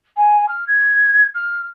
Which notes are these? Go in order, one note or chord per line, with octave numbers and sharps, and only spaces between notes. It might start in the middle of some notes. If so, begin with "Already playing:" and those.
G#5
F6
G#6
F6